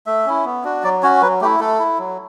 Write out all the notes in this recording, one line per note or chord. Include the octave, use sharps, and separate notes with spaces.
A3 E5
C#4 E4
B3
D4 F#4
F#3 D5
C#4 F#4 C#5
F#3 B4
A3 E4 G4
A3 A4
E4
F#3